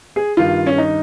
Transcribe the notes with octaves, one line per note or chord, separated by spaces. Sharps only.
G#4
G2 D#3 F4
C#4
D#4